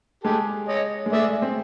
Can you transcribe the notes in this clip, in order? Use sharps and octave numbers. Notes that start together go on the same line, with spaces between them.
G#3 G4 A4
C#5 D#5
G#3
A3 D5 E5
C4